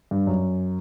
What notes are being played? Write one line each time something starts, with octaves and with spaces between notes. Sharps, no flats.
G2
F#2